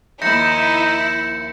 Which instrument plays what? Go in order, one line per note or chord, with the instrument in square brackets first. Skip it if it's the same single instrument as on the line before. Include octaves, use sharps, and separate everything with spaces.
[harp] D#2 F3 [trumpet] D#4 [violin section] E4 [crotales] G6 A#6 C#7